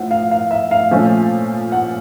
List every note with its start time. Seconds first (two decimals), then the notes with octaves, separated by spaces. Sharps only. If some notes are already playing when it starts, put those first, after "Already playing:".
Already playing: A2 F3 F#5
0.11 F5
0.31 F5
0.51 E5
0.71 F5
0.91 A#2 F3 A3 C#4
1.72 F#5